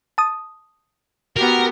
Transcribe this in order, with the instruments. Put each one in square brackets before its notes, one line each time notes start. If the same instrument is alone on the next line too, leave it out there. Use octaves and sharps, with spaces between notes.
[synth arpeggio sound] A5 D#6
[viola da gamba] B3 G4 [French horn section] F#4 [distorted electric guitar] A#4